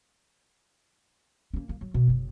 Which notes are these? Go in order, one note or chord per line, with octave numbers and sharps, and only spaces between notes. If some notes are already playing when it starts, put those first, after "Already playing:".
A#3 C#4
A#3
F#3
B2
F#1 C#3